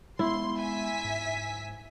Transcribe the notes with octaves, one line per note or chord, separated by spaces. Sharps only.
G#3 B3 E4 C6
E5 G#5 B6
G#2